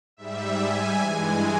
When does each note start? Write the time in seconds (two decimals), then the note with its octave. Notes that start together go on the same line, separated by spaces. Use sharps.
0.17 G#2 G3 E5
0.58 G#5
0.98 G2 E3 G#3